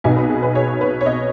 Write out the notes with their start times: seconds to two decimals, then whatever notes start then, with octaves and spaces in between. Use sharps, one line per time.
0.04 B1 B2 B3 D#4 G#5
0.17 B4
0.30 G#4
0.43 B4
0.55 C#5
0.81 B4
1.01 C#5
1.06 D#5